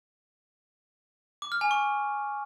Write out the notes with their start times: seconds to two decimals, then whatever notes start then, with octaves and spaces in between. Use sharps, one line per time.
1.42 D6
1.52 F6
1.61 G#5
1.71 C#6